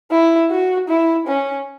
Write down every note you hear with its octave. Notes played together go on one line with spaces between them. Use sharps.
E4
F#4
E4
C#4